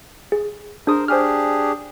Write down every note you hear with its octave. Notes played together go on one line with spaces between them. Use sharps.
G#4
D4 G#4 A#4 C5 D#6
D4 G4 G#4 C5 G#5 F6